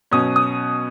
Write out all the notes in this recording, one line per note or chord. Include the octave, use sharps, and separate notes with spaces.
B2 F#3 C#4 D#6
D#6